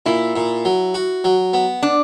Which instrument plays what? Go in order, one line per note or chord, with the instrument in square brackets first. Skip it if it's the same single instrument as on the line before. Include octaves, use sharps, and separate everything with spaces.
[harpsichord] A#2 [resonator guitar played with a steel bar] E4
[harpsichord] A#2
F#3
F#4
F#3
B3
[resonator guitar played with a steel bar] D4